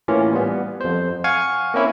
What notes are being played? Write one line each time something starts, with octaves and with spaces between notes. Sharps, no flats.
A2 E3 A#3 C#4 F4
G3 B3
F2 C5
F5 F#5 G#5 C#6 F6 G#6
A#3 C4 C#4 E4